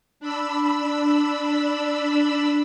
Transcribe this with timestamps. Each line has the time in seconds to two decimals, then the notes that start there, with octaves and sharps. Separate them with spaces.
0.20 D4 B5 E6